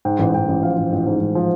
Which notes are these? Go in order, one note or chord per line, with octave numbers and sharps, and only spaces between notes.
G#2 G5
A1
A1 G5
A1
F3 F5
A1
A1
G#2
A1
F3